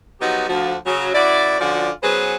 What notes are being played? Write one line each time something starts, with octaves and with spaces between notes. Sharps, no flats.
F3 F#3 B3 D#4 F#4 G4
D2 F3 F#4
C#3 F#3
F#2 E4 F#4 D5
D3 F3 C#4 F4 F#4 D5
F#3 B3 C#4 G#4 B4 C5